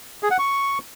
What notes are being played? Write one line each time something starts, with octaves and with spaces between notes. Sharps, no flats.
G#4
F#5
C#6